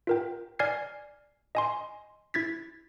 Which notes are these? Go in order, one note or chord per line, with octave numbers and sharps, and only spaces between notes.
F4 A#4 G5
D5 G#5 F6 G#6 C7
D#5 G#5 C6
E4 G#6 A6 B6